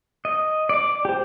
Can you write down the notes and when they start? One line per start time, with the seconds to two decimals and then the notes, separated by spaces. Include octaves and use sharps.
0.25 D#5
0.69 D5 D6
1.05 G4 C5